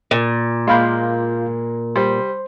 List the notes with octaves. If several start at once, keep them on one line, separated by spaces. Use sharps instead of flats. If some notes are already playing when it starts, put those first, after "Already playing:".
A#2
G#3 A#3 F4 F5 B5 G6
G3 C5 C6